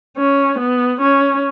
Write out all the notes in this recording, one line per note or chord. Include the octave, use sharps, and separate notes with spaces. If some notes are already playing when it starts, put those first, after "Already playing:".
C#4
B3
C#4